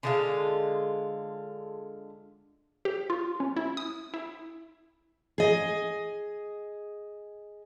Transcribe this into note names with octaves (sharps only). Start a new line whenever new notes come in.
D3 G#3 F4
G4
F4
C#4
E4
D#6
E4
G#4 D#5